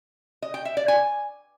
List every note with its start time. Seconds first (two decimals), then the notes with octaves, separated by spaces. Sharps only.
0.42 D#5
0.54 G5
0.65 E5
0.77 D5
0.88 G#5